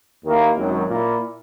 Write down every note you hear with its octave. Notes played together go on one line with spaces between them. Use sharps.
D#2 D#3 A#3 E4
G#1 F#2 D#3 F#3
A#2 A#3 E4